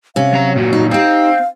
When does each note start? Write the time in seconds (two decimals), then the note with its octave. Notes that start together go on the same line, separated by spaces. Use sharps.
0.16 C3 C#4 F5
0.33 F#3 A#5
0.56 A#2 F#3 F#4
0.73 D#4
0.91 C4 D#4 G4 F5